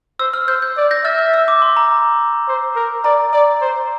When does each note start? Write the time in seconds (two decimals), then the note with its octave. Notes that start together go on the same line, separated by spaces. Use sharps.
0.20 C5 E6
0.34 F6
0.48 C5 G6
0.62 G6
0.77 D5
0.91 G6 A#6
1.04 E5 F6 A6
1.19 F6
1.34 E6
1.48 D6
1.62 C6
1.77 A#5
2.48 C5
2.76 A#4
3.04 D5 A#5
3.33 D5
3.61 C5